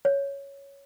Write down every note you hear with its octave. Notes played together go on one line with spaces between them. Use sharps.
C#5